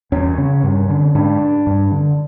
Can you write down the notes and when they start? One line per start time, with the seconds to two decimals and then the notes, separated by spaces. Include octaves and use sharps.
0.12 E2 C#4
0.38 C#3
0.63 G2
0.89 D3
1.15 G#2 D4
1.67 G2
1.92 D3